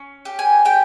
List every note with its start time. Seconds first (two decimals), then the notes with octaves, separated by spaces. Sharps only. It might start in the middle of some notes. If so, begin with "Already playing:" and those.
Already playing: C#4
0.25 G4
0.39 G#5
0.65 G4 G5